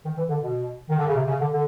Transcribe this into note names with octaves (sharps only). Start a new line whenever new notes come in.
D#3
E3
D3
B2
D#3
D3
C#3
C3
C#3
D3
D3